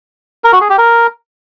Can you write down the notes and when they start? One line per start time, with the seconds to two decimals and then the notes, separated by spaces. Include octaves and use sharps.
0.44 A#4
0.53 F#4
0.61 G#4
0.69 G4
0.78 A#4